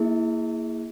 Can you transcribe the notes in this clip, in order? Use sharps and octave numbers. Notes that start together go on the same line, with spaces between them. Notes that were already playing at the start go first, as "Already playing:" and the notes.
Already playing: A#3 E4 G#4